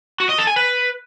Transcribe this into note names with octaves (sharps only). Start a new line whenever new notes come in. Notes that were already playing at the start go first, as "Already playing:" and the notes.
F#4
D#5
A4
G#5
B4